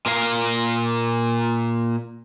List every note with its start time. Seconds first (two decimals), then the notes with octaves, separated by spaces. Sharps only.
0.06 A#2 A#4 F5